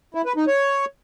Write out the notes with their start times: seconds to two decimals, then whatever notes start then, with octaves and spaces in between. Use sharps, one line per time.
0.15 E4
0.26 B4
0.37 D#4
0.48 C#5